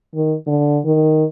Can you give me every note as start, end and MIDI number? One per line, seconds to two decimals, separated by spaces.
0.15 0.35 51
0.47 0.80 50
0.85 1.24 51